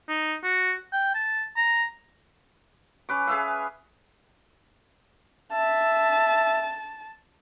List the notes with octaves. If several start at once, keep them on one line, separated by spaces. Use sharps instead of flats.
D#4
F#4
G5
A5
A#5
C#4 B4 D6
G#4 B4 E5 F5
E5 A5